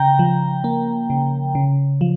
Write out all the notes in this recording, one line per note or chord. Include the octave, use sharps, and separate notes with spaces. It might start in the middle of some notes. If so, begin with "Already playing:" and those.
Already playing: C#3 G5 A#5
F3
A#3
C#3
C#3
F3